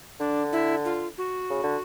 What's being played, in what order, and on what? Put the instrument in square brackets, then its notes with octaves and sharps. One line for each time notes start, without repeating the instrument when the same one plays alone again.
[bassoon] D3 [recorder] D4
[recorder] E4
F4
F#4
[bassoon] C#3
D3